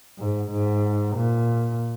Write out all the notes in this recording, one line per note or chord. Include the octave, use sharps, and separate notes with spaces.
G#2
G#2
A#2